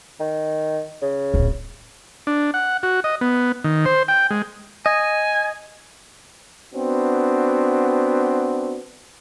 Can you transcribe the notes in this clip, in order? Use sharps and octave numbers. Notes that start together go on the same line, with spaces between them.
D#3
C#3
D1 A#1
D4
F#5
F#4
D#5
B3
D#3
C5
G5
G#3
D#5 G#5
B3 C4 D4 F#4